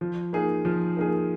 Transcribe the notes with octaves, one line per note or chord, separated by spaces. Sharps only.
F3
A#3 D#4 G#4
F3
A#3 D#4 G#4